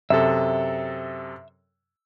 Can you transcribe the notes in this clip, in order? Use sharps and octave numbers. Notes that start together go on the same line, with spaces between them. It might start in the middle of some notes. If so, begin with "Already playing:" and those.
F#2 C3 A4 E5